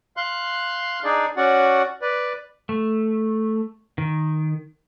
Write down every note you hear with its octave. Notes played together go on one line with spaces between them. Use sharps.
F5 C6 F#6
D4 D#4 G#4 D5
C#4 F#4 D5 F#5
B4 D5
A3
D#3